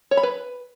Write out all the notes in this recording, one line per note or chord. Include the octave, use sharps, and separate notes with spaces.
C#5
B5
B4